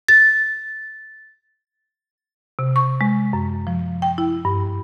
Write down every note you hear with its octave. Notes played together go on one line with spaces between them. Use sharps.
A6
C3
C#6
G#3
F#2
F3
G5
E4
G2